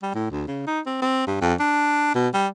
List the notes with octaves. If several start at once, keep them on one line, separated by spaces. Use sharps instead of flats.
G3
A2
D2
C#3
D#4
C4
C4
G2
F2
D4
B2
G3